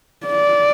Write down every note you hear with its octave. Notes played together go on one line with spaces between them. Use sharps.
D5